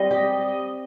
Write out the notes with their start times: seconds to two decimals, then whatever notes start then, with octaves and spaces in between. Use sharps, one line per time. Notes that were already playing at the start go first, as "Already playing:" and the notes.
Already playing: G3 C4 D#5
0.11 G4